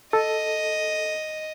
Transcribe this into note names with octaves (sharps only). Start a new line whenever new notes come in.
A4 D#5